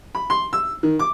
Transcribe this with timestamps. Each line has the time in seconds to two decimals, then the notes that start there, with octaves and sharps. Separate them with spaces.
0.15 B5
0.30 C6
0.53 E6
0.83 D#3
0.99 D6